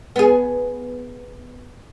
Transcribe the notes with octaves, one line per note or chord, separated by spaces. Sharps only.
B3 G#4